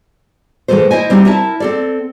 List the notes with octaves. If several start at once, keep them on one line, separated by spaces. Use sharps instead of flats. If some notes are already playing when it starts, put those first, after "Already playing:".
A2 E3 F#3 G#3 A4 C5
E4 C5 D#5 G#5
G3 C4 D#4 G4
E4 A#4 E5 A5
C4 A4 D5